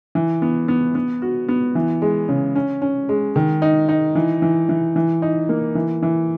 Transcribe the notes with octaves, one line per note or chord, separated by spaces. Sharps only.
E3
B3
B3
B3
F#4
B3
E3
G#3
C#3
C#4
C#4
G#3
D#3
D#4
D#4
E3
E3
E3
E3
D#4
A#3
E3
E3